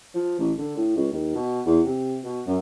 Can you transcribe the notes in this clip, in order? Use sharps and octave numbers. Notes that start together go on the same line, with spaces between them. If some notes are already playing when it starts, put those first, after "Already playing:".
F3
A1
D3
A2
C#2
D#2
B2
E2
C3
B2
F#2